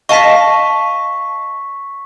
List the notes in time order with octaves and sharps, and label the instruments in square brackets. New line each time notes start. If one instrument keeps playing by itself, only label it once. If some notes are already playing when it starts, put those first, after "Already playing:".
[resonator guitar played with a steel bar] D#5 F5 A5 [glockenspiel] C#6 B6